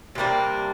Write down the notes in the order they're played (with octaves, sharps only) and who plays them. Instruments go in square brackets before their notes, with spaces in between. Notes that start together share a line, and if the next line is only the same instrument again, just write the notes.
[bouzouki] C3 G3 A#3 D4